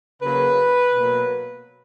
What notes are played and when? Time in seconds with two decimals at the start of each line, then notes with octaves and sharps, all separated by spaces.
0.21 C#3 F#3 A#3 B4
0.95 B2 F#3 A#3